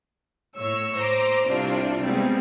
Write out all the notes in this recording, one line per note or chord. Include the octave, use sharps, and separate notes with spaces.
A2 C#5 E6
C5 A#5 D6
C2 C3 D4 F4
G3 G#3 B3 C4